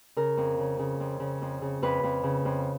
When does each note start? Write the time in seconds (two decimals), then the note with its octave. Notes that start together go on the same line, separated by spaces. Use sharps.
0.16 C#3 A#4
0.37 F2
0.59 C#3
0.79 C#3
1.00 F2
1.20 C#3
1.42 F2
1.62 C#3
1.82 F2 B4
2.03 F2
2.23 C#3
2.45 F2